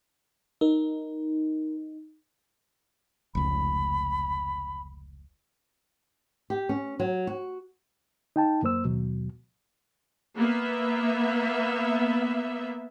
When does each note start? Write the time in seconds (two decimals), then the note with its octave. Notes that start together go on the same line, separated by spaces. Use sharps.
0.61 D#4 A#4
3.35 F1 C#2 B5
6.50 G4
6.69 C#4
7.00 F#3
7.27 F#4
8.36 D#4 G5 A5
8.63 F#2 A#3 C5 E6
8.84 D#2 B2 F#3
10.36 A#3 B3 E5